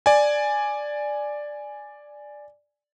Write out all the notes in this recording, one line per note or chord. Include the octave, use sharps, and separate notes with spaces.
D5 G#5